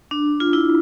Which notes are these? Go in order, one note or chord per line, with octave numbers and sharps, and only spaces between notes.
D4
F4
E4